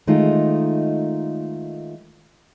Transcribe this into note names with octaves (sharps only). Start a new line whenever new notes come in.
D#3 G#3 A3 D#4 F4